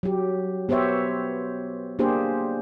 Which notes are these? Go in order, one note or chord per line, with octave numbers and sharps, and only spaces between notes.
F#3 G4
B3 G4 C5 C#5 E5
A#3 D4 G4 G#4 C5